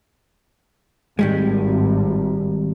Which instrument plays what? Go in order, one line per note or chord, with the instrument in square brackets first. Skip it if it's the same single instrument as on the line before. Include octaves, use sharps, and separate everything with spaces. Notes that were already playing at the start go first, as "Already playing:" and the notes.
[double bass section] G#1 [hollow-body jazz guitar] D#3 G3 G#3